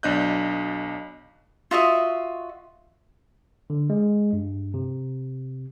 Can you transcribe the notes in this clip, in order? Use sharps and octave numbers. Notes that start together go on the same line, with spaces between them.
B1 D4 D#5 F#6 G6
F4 F#4 D#5 E5
D3
G#3
G2
C3